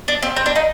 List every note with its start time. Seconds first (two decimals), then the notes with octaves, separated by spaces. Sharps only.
0.08 D4
0.23 C4
0.36 C4
0.46 D4
0.55 D#4